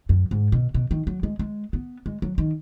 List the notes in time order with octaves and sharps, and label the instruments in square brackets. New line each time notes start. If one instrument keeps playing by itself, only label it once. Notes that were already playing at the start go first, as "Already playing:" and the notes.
[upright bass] F#2
G#2
B2
B2
D#3
F#3
G#3
G#3
B3
G#3
F#3
D#3